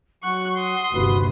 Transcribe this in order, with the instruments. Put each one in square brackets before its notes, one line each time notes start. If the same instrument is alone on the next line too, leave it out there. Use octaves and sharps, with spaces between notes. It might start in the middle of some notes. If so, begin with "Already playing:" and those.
[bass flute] F#3 [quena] F#5 [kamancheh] C#6 F#6
[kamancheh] C6 D#6
[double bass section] G1 D#2 C3 [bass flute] F#4 [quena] B4